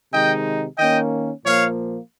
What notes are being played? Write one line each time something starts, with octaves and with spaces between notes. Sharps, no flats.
C3 D#3 G#3 D#4 D#5 G5
D#3 A#3 C#4 D#5 G5
A#2 F3 A#3 C#5 F5